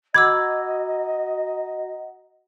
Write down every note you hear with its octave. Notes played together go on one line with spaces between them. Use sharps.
F#4 D#5 F#5 A#5 B5 D6 E6 G#6